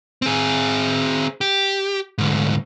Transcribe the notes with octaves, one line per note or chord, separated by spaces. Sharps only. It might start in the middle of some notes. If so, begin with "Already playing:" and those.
C4 G#4
G4
D2 G#2